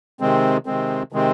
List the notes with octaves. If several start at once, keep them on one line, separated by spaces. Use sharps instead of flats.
C3 D#3 G#3 C4
C3 D#3 G#3 C4
C3 D#3 G#3 C4